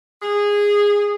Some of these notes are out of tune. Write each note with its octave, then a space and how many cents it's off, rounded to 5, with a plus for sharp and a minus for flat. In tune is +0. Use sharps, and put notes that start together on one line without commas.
G#4 -15